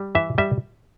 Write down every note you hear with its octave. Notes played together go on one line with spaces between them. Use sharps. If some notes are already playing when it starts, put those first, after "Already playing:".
Already playing: G3
E3 E5
G3 E5